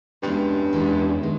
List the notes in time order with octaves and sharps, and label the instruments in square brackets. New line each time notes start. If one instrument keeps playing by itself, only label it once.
[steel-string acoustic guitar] E2 B2 G#3 C#4 E4 [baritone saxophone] G2
[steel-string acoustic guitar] E2 B2 G#3 C#4 E4
D#3 G#3